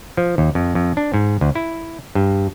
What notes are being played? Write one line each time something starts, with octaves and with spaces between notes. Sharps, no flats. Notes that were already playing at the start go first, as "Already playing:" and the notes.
F3
D#2
F2
F2
D4
G#2
D2
E4
G2